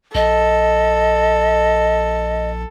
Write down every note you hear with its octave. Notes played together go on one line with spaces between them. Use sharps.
A#1 A4 D#5